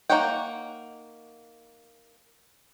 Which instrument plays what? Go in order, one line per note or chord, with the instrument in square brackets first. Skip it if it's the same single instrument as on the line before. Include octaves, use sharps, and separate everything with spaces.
[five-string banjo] A#3 D#4 C#5 F#5 G5